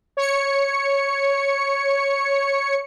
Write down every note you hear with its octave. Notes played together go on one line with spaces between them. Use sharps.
C#5 C#7